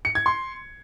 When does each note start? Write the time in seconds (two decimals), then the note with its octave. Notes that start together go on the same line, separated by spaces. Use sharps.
0.05 C#7
0.15 G#6
0.26 C6